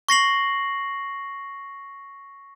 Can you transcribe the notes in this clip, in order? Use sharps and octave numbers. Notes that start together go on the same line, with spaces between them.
C#6 A#6 C7 F#7